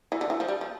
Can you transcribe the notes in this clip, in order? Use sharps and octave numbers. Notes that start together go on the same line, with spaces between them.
E3
D3
E3
F3
G3
F3